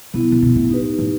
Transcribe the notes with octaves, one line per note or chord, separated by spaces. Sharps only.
C3 F#3 B3 E4
C3
B2
A2
D#4 G4 B4
A2